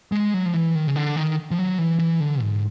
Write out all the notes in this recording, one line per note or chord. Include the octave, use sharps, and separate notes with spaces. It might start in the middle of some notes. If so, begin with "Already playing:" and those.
G#3
F#3
F3
E3
D#3
C#3
D3
D#3
F3
F#3
E3
E3
D3
G#2